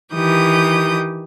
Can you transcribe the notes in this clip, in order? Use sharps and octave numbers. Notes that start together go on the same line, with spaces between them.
D#3 E3 G4 D#6 G6